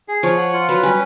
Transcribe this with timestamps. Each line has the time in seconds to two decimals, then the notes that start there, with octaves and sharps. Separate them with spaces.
0.08 G#4
0.23 F3 C#5
0.37 F#5
0.53 F4
0.68 F#3 B4
0.83 G3 C#4